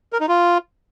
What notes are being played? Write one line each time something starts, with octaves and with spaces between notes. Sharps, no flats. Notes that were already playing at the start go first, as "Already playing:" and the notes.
A#4
D#4
F4